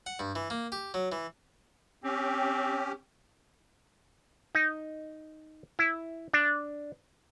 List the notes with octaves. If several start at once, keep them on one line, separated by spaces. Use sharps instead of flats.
F#5
G2
E3
A#3
G4
F#3
E3
C4 C#4 G4
D#4
E4
D4